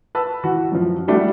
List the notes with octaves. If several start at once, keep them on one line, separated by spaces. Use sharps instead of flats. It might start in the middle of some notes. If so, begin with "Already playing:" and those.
B4 A5 E6
E3 F#4
F#2 F3
G3 A3 D4 E4 F#4 G4